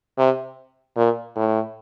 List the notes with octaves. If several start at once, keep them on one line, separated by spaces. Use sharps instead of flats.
C3
A#2
A2